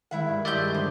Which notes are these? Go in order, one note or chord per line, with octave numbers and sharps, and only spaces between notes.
D#3 G#3 E4 E5 F#5
G2
A2 G#3 G4 D5 E5 D#6 G6
G#4
D3 C5